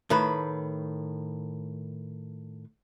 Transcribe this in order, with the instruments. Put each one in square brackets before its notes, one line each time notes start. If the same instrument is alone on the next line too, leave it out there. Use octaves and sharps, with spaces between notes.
[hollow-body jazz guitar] A2 D#3 B4